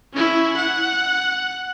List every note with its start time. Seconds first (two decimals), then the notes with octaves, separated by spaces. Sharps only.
0.13 C#4 E4
0.57 F#5